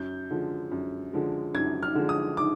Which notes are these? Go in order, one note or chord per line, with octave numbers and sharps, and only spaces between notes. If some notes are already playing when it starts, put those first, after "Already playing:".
Already playing: F#2 G6
D3 F3 G#3
F#2
D3 F3 G#3
F#2 G#6
F6
D3 F3 G#3
D#6
D6